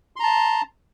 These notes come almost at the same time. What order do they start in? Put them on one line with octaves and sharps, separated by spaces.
C6 A#5 A5